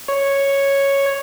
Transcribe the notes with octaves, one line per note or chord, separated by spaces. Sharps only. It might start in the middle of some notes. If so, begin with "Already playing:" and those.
C#5